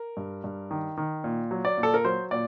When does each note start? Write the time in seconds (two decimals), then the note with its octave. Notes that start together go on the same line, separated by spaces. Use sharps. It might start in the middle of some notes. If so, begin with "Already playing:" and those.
Already playing: A#4
0.17 G2
0.44 G2
0.71 D#3
0.97 D#3
1.24 A#2
1.51 F#3
1.65 D5
1.78 A#2
1.83 A4
1.94 A#4
2.05 F#3 C5
2.31 A#2 D5